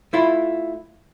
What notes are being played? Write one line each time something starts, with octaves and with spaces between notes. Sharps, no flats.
A3 E4 F4